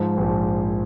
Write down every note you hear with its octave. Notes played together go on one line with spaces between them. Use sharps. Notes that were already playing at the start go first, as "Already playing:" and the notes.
Already playing: G#2 F3
A#1 G#2 F3